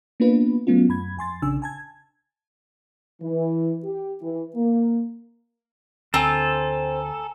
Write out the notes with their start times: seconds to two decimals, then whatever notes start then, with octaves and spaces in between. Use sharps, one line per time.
0.20 A#3 B3 D4 F4 B4
0.67 F#3 A3 B3 C#4 F4
0.89 F#2 B5 G#6
1.17 F2 G#5 C6 A6
1.42 A#1 C#3 D4 G#5 E6
1.62 G#5 A5 G#6
3.21 E3
3.84 G4
4.21 E3
4.56 A#3
6.14 D2 C4 A4 G#5 A#5